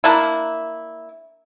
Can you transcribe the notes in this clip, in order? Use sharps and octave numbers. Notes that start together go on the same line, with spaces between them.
A#3 D4 E4